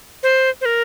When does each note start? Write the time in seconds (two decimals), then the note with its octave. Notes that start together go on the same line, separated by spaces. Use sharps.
0.23 C5
0.61 C5
0.65 A#4